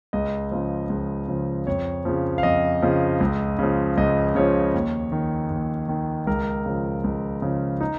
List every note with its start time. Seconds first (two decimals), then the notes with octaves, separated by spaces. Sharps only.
0.13 C#2 D#5
0.52 C#3 F3
0.90 C#2
1.28 C#3 F3
1.67 F2 C#5
2.05 C#3 F3
2.38 F5
2.43 F2 D#5
2.82 C#3 F3
3.20 C#2
3.59 C#3 F3
3.97 C#2 D#5
4.35 C#3 F3 C#5
4.74 D#2
5.12 D#3
5.50 D#2
5.88 D#3
6.27 C#2 A#4
6.66 C#3 F3
7.04 C#2
7.42 C#3 F3
7.81 D#4